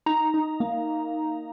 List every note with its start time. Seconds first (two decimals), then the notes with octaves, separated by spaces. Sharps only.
0.06 D#4 A#5
0.34 D#4
0.60 A#3